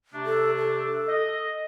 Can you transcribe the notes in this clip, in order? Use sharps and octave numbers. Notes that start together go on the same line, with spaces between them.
C3 A3 D4
A4
A4
D#5